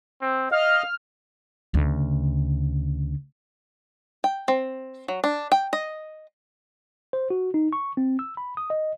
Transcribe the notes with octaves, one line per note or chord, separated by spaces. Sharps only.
C4
D#5 F5 F6
D2 C#3
G5
C4
F#3
D4
G5
D#5
C5
F#4
D#4
C#6
C4
E6
B5
D#6
D#5